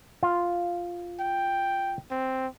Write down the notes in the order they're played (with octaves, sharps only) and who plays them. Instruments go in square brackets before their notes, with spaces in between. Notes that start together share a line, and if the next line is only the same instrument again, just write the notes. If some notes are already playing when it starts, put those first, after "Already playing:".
[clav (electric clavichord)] F4
[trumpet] G5
C4